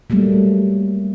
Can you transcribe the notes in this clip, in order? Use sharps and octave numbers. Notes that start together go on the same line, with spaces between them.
F#3 G3 A3 A#3